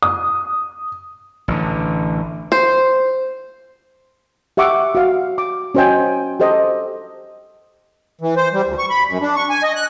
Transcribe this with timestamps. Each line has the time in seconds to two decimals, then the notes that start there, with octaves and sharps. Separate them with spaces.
0.02 D#6
1.48 A1 D3
2.52 C5
4.57 G4 E5 F#5 C#6 D6
4.95 F#4 F5
5.38 D6
5.75 C#4 F#4 C5 D#5 G5 G#5
6.40 G4 A4 C5 D#5
8.21 E3
8.36 C5
8.53 G3
8.66 D2
8.79 C#6
8.90 B5
9.08 F#2
9.21 D4
9.36 C#6
9.50 G#5
9.63 D#5
9.75 F#6